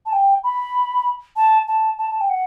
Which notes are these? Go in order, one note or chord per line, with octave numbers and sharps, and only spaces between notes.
A5
G5
B5
A5
A5
A5
A5
G5
F#5